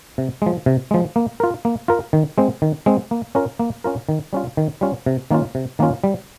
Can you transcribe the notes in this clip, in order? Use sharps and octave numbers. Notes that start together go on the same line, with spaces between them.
C3
F3 G#3
C3
F3 G#3
A#3
F4 A#4
A#3
F4 A#4
D#3
G#3 C4
D#3
G#3 C4
A#3
C#4 F4 A#4
A#3
C#4 F4 A#4
D#3
G3 C#4 F4
D#3
G3 C#4 F4
C3
D#3 A#3 C#4 F4
C3
D#3 A#3 C#4 F4
G3